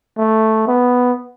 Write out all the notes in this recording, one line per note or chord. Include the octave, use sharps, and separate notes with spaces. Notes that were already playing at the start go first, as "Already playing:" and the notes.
A3
B3